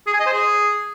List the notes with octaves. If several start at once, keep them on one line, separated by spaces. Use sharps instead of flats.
G#4
G#5
D#5
C5
G#4